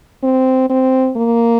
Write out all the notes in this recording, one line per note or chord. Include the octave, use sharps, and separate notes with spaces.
C4
C4
A#3